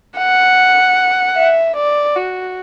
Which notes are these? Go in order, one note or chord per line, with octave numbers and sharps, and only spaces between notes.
F#5
E5
D5
F#4